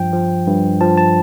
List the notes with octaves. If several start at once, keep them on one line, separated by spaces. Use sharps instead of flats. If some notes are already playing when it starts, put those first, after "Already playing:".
Already playing: G2 F3 G5
F3
G2
F3 A5
A5